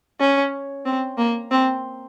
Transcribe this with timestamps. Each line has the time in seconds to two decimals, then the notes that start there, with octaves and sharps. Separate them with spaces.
0.20 C#4
0.86 C4
1.18 A#3
1.51 C4